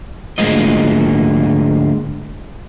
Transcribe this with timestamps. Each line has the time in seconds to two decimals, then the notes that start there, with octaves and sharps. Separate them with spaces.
0.38 D2 G#2 G#3 A#3 F4 D#5